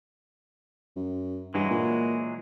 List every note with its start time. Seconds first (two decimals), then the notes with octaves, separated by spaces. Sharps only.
0.96 F#2
1.54 G2 E3 F#3 G#3
1.70 A#2